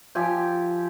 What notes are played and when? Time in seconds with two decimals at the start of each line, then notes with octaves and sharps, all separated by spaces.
0.15 F3 G4 E5 G#5